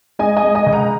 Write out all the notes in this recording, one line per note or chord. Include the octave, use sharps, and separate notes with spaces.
G#3 D#5 G#5
D#5 G#5
G#3
D#5 G#5
C#2
F#5 A#5